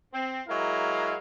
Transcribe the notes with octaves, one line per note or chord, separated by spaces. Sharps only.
C4
F#3 G#3 E4 A#4 D#5 F5